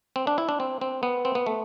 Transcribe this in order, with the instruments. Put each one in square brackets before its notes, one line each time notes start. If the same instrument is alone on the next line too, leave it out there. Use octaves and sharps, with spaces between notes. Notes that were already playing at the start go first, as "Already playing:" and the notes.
[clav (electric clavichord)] C4
D4
E4
D4
C4
C4
B3
C4
B3
A3